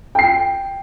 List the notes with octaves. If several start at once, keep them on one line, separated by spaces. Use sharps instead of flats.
G5 C7